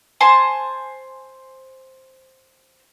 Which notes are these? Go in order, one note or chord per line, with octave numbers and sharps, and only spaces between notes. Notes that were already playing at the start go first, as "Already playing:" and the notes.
C5 G#5 A5 C6